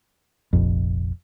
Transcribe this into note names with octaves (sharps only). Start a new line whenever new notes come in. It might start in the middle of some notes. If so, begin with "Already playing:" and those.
F1 A#1 F2